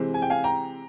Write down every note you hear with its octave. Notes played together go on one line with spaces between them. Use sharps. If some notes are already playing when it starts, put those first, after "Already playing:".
Already playing: C3 E3 G#3 C4
G#5
G5
F5 G#5
G5 A#5